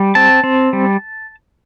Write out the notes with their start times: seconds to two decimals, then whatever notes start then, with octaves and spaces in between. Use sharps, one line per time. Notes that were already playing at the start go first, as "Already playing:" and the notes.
Already playing: G3
0.15 C4 A5
0.44 C4
0.73 G3